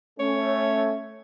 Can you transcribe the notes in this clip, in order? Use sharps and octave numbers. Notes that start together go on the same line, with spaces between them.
A3 C#4 C#5